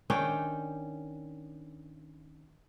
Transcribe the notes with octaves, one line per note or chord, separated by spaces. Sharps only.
D#3 C#4 D4 G5